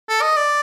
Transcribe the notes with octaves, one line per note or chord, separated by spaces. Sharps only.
A4
D#5
D5